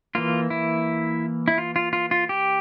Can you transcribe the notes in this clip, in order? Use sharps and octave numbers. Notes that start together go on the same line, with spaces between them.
E3 A#3 F4
E4
E4
F4
F4
F4
F4
G4